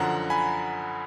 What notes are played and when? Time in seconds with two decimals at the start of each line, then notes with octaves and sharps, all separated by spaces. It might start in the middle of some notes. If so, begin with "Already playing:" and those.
Already playing: F#2 D3 F3 F#5 A#5
0.30 G#5 B5